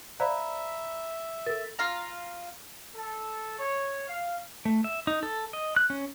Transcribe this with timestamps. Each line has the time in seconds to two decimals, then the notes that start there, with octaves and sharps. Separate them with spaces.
0.20 C5 D5 E5 F5 A#5 B5
1.46 A4 A#4 A6
1.79 F4 F5 A#5
2.94 A4
3.59 C#5
4.07 F5
4.65 A3
4.84 E5
5.07 D#4
5.23 A4
5.53 D#5
5.76 F#6
5.90 C#4